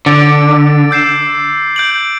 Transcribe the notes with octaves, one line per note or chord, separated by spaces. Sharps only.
D3 D6 A6 D7
E6 G6 C7 E7
G6 D7 F#7